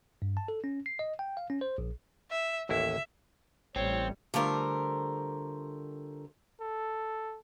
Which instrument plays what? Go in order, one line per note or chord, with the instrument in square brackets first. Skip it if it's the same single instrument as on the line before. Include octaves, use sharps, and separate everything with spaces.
[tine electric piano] G2
A5
A4
C#4
C7
D#5
G5
F5
C#4
C5
A#1
[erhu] E5
[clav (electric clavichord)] A1 D#2 E4 [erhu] E5
[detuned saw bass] A1 [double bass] A2 G3 [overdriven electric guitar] C4 [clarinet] C#5
[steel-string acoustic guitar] D3 G3 A3 F4 A#4 C5
[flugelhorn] A4